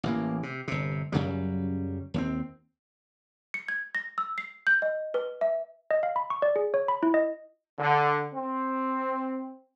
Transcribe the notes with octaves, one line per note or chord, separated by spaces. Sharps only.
A1 E3 A#3
C3
G1 C3
F#2 C#3 F#3 G3
D#2 A3 C4
C#7
G#6
A#6
E6
C7
G6
D#5
B4
E5
D#5
F5
B5
C#6
D5
G#4
C#5
B5
E4
D#5
D3
C4